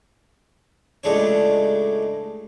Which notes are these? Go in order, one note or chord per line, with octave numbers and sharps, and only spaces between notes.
C#2 A2 G#3 D4 C#5